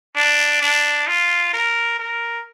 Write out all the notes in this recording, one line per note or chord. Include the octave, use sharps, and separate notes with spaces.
D4
D4
F4
A#4
A#4